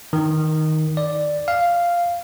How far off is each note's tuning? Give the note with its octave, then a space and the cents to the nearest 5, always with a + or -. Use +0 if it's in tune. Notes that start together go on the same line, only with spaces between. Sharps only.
D#3 +5
D5 +5
F5 -5